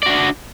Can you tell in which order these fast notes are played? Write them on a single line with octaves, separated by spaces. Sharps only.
D5 F#4 D4